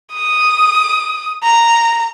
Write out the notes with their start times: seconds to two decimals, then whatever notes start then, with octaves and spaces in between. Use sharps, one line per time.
0.13 D#6
1.43 A#5